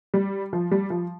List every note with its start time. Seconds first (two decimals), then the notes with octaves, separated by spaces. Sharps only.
0.14 G3
0.53 F3
0.71 G3
0.90 F3